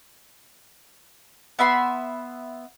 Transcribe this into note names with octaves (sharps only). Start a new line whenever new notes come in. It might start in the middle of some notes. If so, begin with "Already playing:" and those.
B3 E5 B5 C6